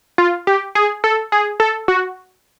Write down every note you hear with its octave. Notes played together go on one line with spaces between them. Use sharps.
F4
G4
G#4
A4
G#4
A4
F#4